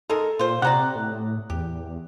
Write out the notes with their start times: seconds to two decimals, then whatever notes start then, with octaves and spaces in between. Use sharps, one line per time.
0.10 G#3 D#4 A4 A#4
0.39 A#2 F4 C5
0.62 C3 G4 C5 D5 F#5 A#5 F#6
0.96 A2
1.50 E2 G4